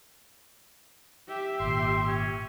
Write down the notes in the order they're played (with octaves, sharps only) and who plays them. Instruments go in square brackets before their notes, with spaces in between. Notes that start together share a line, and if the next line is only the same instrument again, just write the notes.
[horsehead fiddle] G4 E5
[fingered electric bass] G#1 A#2 [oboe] C6
[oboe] C#4